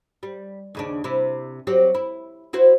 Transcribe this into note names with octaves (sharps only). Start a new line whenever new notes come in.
G3
D#2 C#3 D4
C3 E4
F#3 C4 G4
E4
E4 F#4 C5